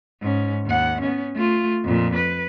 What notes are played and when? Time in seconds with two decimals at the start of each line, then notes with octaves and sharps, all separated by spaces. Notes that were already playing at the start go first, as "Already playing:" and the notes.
0.21 G#2 C#4
0.66 D#2 F#5
1.01 B3 C#4
1.34 A3 F4
1.84 F2 A#2
2.15 B4